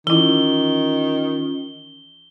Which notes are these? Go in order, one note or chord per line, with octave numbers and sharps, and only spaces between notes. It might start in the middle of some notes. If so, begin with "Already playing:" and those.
D#3 E3 C#4 E4 F4 G7